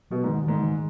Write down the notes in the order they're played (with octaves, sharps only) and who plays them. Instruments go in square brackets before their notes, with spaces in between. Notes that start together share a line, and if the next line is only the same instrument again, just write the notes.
[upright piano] B2 [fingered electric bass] F#3
[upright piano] G#2
[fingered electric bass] D#3
[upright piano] G#2 [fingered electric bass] D#3
[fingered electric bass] D#3